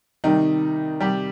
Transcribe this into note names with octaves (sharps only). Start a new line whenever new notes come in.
C3 D#3 G3 D#4
C3 G3 G4